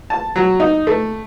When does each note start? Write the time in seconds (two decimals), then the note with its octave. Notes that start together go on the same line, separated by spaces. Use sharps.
0.10 A5
0.36 F#3
0.60 D#4
0.87 A3